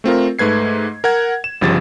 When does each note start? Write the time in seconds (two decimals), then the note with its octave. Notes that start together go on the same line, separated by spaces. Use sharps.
0.04 A3 C4 F4 A#4
0.39 G#2 A3 B4 G#6 C7
1.04 A#4 F#5 G#6
1.44 E7
1.61 G1 C#3 F3 G4 A6